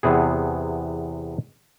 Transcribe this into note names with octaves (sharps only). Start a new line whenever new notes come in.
E2 C3 B3 G#4